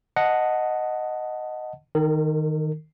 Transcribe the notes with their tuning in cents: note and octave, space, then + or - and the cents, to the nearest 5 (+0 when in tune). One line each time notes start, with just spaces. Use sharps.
D#5 +0 F#5 +0 A5 +0
D#3 +0 A#4 -45